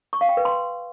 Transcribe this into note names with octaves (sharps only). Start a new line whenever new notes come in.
C#6
F5
G5
B4
C6